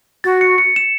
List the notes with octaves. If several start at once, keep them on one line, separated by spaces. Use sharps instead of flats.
F#4 A6
C#7
C#7
E7